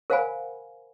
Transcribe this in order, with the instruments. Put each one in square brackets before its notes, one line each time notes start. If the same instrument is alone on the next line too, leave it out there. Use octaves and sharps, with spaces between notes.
[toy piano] A#4 C5 F5 F#5 G#5 B5